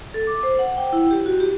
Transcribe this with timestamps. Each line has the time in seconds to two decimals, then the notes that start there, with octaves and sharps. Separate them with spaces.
0.14 A4
0.27 D6
0.43 C5
0.59 F#5
0.77 G5
0.93 E4
1.11 G4
1.26 F#4
1.40 G4